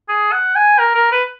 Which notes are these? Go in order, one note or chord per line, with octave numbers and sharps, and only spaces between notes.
G#4
F#5
G#5
A#4
A#4
B4